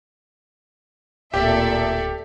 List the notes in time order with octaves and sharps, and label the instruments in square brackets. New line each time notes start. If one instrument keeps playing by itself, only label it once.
[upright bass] D1 [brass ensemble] A#2 [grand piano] G4 [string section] A4 D5 E5